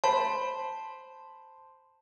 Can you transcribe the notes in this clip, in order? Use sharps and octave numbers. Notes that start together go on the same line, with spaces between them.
C5 A5 B5